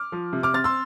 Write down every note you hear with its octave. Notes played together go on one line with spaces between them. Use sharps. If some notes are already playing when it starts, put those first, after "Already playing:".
Already playing: D6 F6
F3
C3
D6 F6
C4 F6 A6
C6 E6